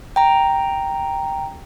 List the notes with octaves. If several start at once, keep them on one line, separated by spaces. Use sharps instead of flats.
G5 A#5